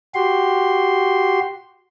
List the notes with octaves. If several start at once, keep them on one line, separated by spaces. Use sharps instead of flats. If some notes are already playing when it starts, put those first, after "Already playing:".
F#4 G4 C6